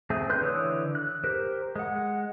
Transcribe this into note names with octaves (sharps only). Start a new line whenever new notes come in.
A3 C4 G#4
D4 B4 C6 F#6 G6
D3 E3 C#5 D#6 E6
F#6
G4 A#4 C5
G#3 F#5